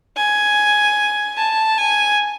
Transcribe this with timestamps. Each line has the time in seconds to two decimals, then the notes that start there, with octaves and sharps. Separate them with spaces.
0.17 G#5
1.37 A5
1.77 G#5